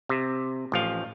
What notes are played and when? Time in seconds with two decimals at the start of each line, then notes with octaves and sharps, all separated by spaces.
0.09 C3
0.72 A1 F3 F5